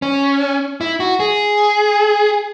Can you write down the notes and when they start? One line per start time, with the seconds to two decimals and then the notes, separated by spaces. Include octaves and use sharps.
0.02 C#4
0.81 E4
1.00 F#4
1.20 G#4